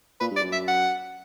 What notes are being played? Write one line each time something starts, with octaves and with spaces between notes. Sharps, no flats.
A#2 B4
G2
D5
F#2
E5
F#5